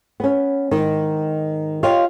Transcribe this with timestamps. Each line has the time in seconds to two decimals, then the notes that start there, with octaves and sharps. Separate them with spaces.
0.20 B3 C#4
0.71 G#2 D#3 D#4
1.83 F4 G4 C#5 D#5 F5